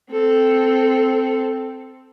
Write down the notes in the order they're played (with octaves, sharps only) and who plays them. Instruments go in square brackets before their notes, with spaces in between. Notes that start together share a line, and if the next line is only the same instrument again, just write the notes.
[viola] C4 A4